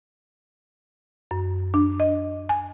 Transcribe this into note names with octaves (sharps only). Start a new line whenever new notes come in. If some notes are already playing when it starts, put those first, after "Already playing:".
F#2
D4
D#5
G#5